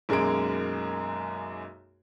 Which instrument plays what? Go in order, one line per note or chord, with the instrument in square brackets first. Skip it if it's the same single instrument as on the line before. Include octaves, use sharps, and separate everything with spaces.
[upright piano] B1 F#2 G#3 A#3 G#4 D7